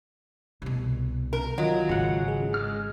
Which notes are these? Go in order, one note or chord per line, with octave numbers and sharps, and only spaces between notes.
C2 B2
A#4
D#3 F#3 F4 D#5
G#1 G#2 C#3 F#5
G#4
G#3 F6